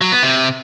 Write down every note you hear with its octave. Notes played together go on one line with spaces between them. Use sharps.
F#3
B3
C3